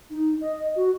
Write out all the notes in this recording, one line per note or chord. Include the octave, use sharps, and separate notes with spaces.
D#4
D#5
F#4